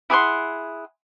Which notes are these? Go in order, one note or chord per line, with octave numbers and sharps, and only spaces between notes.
E4 G#4 F#5 C6